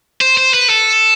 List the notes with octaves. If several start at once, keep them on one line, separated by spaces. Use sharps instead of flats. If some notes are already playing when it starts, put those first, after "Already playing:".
C5
C5
B4
A4